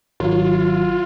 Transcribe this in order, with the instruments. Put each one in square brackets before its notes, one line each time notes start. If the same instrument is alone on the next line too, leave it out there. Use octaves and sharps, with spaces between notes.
[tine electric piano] G#1 D#3 F#3 [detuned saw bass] F4